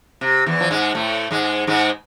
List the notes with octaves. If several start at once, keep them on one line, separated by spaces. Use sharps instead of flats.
C3
E2 E3
F3
G#2 G#3
A2 A3
G#2 G#3
G#2 G#3